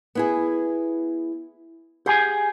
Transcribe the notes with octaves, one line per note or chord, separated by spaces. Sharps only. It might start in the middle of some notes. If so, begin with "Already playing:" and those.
B3 E4 G#4
G4 G#4 F#5 G#5